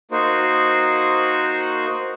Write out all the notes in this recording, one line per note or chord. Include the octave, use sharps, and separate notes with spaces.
A#3 D#4 F#4 C5